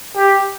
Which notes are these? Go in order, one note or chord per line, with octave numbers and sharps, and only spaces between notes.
G4